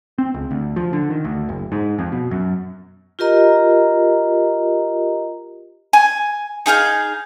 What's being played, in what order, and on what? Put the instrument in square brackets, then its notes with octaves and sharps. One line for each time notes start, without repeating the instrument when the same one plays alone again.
[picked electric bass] C4
C#2
D2
F3
D3
D#3
D2
F#1
G#2
F2
B2
F#2
[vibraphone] F4 G4 A#4 D#5 A#5
[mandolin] G#5
D#4 G#4 F5 G6